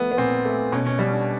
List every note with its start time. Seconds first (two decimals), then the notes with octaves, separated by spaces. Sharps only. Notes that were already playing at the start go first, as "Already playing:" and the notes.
Already playing: F3 A3 B3
0.12 B3
0.17 A#2 C4
0.45 A3
0.72 B2 C#4
0.86 C#4
0.99 G3 C#4
1.13 D4